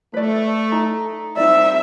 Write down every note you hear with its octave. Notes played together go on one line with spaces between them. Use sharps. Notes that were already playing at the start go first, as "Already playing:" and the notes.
A3 B4 D5
D#4 A4 A#5
A#2 G3 C4 D#4 D5 E5